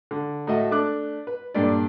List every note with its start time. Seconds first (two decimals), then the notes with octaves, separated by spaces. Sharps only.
0.11 D3
0.47 A2 F#4 A4 D#5 E5
0.71 A3 D4 D6 F#6
1.27 B4
1.55 G2 A#2 D4 A4 D5